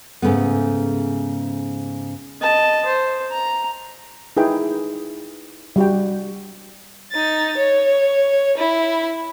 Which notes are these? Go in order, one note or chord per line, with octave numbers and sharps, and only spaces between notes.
G#2 C#3 A3 B3
D#5 A5
C5
A#5
D#4 E4 G#4 B4 G5
G3 F#4 G5
D#4 A6
C#5
E4